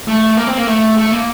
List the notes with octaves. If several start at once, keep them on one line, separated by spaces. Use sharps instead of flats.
A3
A#3
C4
A#3
A3
A3
A#3